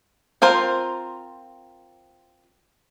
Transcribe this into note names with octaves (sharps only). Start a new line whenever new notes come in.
C4 F4 A#4 C5